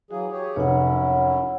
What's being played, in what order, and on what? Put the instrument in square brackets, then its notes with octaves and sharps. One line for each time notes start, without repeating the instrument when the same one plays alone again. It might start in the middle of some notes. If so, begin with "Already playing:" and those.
[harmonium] E3 F#3 G#4 [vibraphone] F#4 F5
[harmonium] G4 G#4 C#5
[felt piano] F1 [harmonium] F#2 C#4 E4 [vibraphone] C#5 F#5